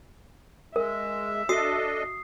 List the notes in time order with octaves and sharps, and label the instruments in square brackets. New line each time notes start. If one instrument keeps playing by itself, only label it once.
[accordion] G#3 [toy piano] A#4 [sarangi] E5
[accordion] D4 A4 D#5 [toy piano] F#4 [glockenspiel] D#6 C7